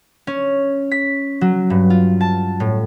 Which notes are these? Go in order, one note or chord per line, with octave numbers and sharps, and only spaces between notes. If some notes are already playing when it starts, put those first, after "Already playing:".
C#4
B6
F#3
G2
F4
A5
A2